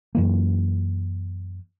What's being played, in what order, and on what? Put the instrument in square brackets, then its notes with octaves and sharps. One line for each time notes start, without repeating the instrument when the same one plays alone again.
[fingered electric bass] F#2 E3 A#3